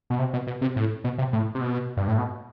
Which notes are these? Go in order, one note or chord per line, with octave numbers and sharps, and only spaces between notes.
B2
C3
B2
B2
C3
A2
B2
C3
A2
C3
B2
G2
A2
B2